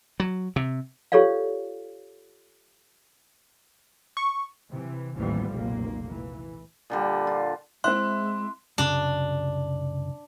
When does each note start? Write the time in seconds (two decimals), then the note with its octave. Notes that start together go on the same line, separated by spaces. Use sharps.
0.20 F#3
0.56 C3
1.12 F4 G4 A4 C#5 D5 F5
4.17 C#6
4.70 C3 E3
5.15 A1 D#2 E3 F3 G3 B3
5.53 F1 B1 A#2 A#3
6.08 E3
6.90 A#2 D3 G3
7.27 F4
7.84 G#3 C4 E4 C6 F#6
8.78 C2 F#2 C#3 D4